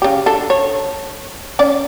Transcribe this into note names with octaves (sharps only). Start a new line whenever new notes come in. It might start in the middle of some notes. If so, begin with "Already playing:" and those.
C#3 G4
D4 A4
C#5
C#4 D5